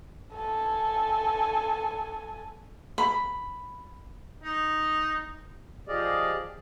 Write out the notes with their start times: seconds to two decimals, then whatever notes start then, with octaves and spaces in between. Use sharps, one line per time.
0.34 A4 G#5
2.98 B5
4.44 D#4
5.88 F3 G4 G#4 D5 D#5 F5